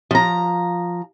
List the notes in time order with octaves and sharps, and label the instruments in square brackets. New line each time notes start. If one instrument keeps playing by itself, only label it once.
[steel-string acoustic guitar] F3 A#5